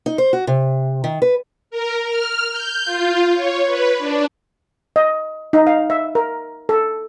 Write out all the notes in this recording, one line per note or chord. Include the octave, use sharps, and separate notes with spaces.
D#4
C5
F#4
C3
D#3
B4
A#4
F6
G6
F4
C#5
B4
D4
D#5
D#4
F5
E5
A#4
A4